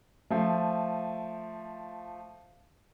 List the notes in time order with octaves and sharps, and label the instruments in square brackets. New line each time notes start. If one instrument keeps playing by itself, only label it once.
[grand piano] F3 A3